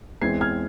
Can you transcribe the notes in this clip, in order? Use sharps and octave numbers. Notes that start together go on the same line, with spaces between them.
E2 E3 G#3 C4 G#6 C7
F6 G#6